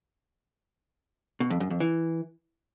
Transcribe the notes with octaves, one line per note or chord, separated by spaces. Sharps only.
B2
F2
F#2
F2
E3